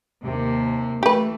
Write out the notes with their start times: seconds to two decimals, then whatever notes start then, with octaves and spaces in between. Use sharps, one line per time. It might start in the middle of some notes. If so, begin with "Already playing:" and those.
0.24 D#2 C3 A#3
1.03 E3 A3 G4 B4